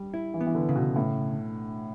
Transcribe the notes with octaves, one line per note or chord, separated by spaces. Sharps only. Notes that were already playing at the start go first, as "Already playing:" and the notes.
Already playing: G3
E4
E3
B3
E3
D3
C#3
B2
A2